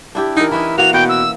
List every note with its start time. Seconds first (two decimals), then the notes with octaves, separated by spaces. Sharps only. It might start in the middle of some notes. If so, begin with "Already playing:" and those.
0.15 D4 E4 G4
0.37 E3 D#4 A#4
0.51 E3 C#4 D#4 E4
0.78 E3 A#3 F#4 F7
0.93 B2 F#5 G5
1.08 E6